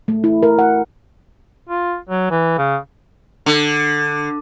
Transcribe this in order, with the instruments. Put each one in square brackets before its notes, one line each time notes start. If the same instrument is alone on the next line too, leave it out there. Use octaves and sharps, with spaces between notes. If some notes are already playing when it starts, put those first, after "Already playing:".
[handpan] A3
E4
A#4
F#5
[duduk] F4
F#3
E3
C#3
[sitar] D3